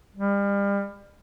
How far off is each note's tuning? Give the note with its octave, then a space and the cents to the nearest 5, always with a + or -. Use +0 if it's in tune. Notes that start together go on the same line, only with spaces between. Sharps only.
G3 +35